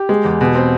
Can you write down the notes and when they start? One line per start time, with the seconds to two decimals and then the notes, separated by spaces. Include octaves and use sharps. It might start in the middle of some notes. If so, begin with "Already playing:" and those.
Already playing: G4
0.09 G#3
0.25 E2
0.41 B2
0.55 C4